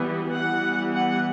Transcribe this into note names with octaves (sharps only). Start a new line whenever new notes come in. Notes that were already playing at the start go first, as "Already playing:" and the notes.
Already playing: E3 G3 B3
E3 G3 B3 F#5
F#5